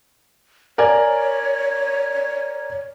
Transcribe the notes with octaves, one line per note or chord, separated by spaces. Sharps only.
A#4 C#5 D5 G#5